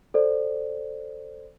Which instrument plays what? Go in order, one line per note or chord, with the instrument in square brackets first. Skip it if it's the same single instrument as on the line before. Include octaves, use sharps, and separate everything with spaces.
[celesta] A4 C5 D5